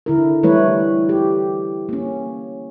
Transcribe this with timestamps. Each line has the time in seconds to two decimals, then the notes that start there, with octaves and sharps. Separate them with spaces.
0.06 D3 E4 A#4
0.43 E3 G3 A3 E4 B4 C#5
1.09 G4
1.89 A#3 C#4